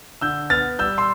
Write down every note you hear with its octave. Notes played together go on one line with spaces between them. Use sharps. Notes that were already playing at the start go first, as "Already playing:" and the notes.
D3 E6 G6
B3 F6 A6
G3 E6 G6
C6 E6